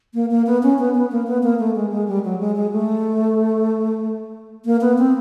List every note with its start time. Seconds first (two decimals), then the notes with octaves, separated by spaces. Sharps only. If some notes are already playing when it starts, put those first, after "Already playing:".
0.14 A#3
0.31 A#3
0.46 B3
0.63 C#4
0.79 B3
0.95 B3
1.12 A#3
1.27 B3
1.43 A#3
1.59 A3
1.75 G#3
1.91 G#3
2.08 G3
2.24 F#3
2.40 G#3
2.56 G#3
2.72 A3
4.65 A#3
4.81 B3
4.98 C4